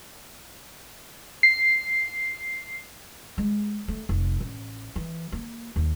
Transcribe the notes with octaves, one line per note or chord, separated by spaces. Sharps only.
C7
G#3
A3
F1
A1
E3
A#3
D#2